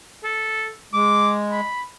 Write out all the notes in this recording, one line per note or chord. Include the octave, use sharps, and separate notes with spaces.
A4
G#3 D6
B5